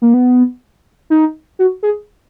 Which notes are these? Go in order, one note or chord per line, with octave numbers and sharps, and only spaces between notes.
A#3
B3
D#4
F#4
G#4